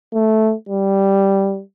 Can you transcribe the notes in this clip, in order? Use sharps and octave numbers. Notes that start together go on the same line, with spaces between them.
A3
G3